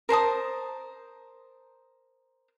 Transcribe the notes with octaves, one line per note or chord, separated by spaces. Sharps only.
A#4 C5 A5 D#6